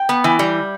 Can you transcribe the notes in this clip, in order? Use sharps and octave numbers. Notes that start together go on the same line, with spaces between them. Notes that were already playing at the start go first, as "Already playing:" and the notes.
Already playing: G5
B3
E3
G3